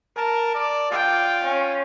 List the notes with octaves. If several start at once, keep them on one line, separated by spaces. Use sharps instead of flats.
A#4 A5
D5
F4 G5
C#4